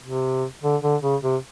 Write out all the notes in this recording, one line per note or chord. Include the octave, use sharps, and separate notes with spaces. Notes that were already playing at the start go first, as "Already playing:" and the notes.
C3
D3
D3
C#3
C3